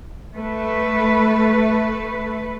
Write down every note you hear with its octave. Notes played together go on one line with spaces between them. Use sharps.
A3 B4